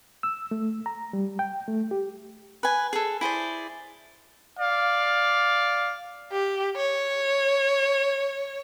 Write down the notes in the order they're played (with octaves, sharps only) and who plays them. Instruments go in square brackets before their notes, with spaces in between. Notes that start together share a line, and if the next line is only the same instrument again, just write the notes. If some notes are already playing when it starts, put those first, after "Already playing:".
[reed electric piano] E6
A3
A#5
G3
G5
A3
G4
[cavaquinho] B4 G#5
G#4 A4
E4 G#4 C5 D5
[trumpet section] D5 F5
[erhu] G4
C#5